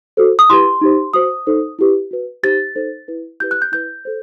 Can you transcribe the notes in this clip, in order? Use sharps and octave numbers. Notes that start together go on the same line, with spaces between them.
F#4 A4 C5
D#6
E4 G4 B4 C6
D#4 G4 C5
F#4 C5 D#6
D#4 A4 C5
E4 G4 B4
F#4 B4
D#4 G4 C5 A6
D#4 A4 C5
E4 B4
E4 G4 B4 G6
F#6
G6
E4 B4 G6
A4 C5